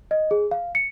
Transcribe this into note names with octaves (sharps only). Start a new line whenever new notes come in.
D#5
G#4
F5
C#7